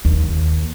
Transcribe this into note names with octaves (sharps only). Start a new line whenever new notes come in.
D#2